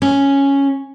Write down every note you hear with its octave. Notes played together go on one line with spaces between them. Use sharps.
C#4